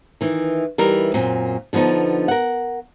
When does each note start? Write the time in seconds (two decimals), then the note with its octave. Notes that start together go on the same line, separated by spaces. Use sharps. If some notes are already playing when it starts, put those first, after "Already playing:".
0.21 D#3 E3
0.78 E3 G3 D#4 A#4
1.14 F#2 A#2 C4
1.73 D3 F3 B3 D4 D#4
2.28 A#4 F#5